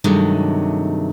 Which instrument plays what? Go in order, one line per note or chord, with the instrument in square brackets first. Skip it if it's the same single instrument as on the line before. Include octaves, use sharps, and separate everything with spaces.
[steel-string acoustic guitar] G2 C3 D#3 F#3 G#3 A3